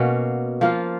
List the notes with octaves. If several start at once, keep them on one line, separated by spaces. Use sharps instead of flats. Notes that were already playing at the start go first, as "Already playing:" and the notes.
Already playing: B2 A#3 C#4 F#4
F3 A#3 F4